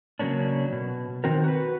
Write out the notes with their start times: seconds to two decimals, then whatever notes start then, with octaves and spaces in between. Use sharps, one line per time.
0.19 C#3 F#3 A#3 C#4 D4
0.72 B2
1.24 D#3 C4 F#4 A#4
1.44 F#4 B4